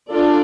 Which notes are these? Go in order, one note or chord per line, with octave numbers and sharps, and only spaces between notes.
D4 F4 A4 D5